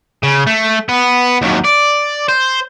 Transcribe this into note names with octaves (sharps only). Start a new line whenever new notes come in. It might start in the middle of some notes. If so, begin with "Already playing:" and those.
C#3
A3
B3
D#2 F#3
D5
C5